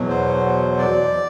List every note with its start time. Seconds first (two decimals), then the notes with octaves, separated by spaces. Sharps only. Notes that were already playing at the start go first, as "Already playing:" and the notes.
Already playing: E2 B2 F#3
0.09 C5
0.78 D5